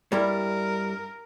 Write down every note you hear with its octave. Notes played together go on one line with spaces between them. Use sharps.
G2 G3 E4 A#4